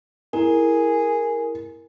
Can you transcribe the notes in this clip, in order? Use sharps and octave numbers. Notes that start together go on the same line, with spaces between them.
E4 G#4 A#4